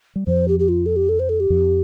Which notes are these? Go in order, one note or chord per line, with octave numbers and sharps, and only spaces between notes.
G3
F2 F3 C5
G4
G4
F4
A4
G4
A4
C5
A4
G4
F2 F3